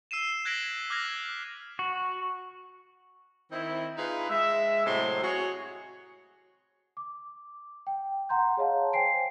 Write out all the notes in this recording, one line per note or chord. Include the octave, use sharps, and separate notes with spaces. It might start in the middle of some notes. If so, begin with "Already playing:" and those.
E6 C7 D#7 E7
F#6 G#6 A#6 B6 D7 F#7
D6 F6 F#6 G#6 A#6
F#4
D#3 C4 D#4 E4
D#4 F4 G#4 B4
G#3 E5
A2 C3 F#3 G#3 C4 C6
F#4 G#4 C#5
D6
G5
F#5 A#5 C6 G6
G#4 C#5 D#5 F5 A5
C5 G5 G#5 C7 D7